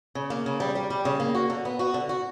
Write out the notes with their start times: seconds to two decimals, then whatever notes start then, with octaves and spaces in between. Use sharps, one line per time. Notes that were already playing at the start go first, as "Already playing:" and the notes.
0.15 C#3
0.30 A#3
0.46 C#3
0.60 G3
0.75 G3
0.90 G3
1.05 C#3
1.20 A#3
1.35 F#4
1.50 D3
1.65 B3
1.79 F#4
1.94 D3
2.09 F#4